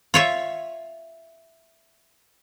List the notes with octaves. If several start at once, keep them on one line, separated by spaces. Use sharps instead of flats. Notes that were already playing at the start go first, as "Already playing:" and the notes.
F4 C#5 E5